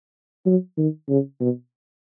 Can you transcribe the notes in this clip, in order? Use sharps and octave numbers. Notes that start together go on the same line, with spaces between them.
F#3
D#3
C#3
B2